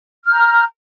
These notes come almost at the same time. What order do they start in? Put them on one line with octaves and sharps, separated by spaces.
F6 G6 A#5